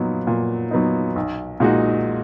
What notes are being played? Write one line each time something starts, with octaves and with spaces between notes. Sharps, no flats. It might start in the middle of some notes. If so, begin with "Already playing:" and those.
Already playing: A#2 F#3 B3 D#4
A#2
F#3 B3 D#4
B1
A#2 G#3 D#4 F#4